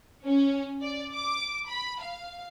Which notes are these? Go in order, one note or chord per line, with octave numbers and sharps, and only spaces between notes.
C#4
D5
D6
B5
F5